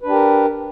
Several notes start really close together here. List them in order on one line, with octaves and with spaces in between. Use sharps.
B4 D4 G4 A#4